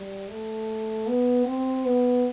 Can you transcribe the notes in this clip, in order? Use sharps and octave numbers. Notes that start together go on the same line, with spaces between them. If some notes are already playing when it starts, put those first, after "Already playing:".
Already playing: G3
A3
B3
C4
B3